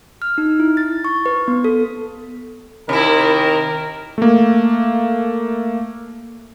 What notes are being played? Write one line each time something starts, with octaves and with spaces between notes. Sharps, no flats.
F6
D#4
E4
A6
C#6
B4
B3
A4
C3 D#3 E4 A#4
A3 A#3